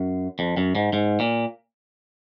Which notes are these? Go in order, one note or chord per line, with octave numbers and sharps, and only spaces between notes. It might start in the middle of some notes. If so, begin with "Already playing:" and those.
Already playing: F#2
F2
F#2
G#2
G#2
A#2